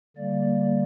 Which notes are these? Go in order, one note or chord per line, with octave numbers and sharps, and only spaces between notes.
D3 G3 A#3 D5